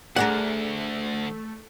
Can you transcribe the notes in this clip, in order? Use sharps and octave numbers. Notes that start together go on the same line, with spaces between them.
D2 A3 D4 G#4 A#4 F#5